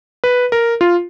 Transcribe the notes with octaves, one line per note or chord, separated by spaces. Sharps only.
B4
A#4
F4